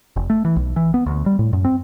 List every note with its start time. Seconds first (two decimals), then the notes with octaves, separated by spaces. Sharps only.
0.16 F1
0.30 A3
0.45 E3
0.56 B1
0.76 E3
0.94 B3
1.06 D2
1.26 G3
1.39 A2
1.53 F#2
1.65 C4